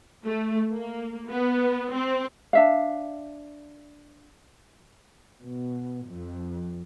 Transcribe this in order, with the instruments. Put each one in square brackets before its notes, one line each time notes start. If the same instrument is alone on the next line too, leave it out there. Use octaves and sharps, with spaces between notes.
[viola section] A3
A#3
B3
C4
[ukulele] D4 E5 F5
[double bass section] B2
F2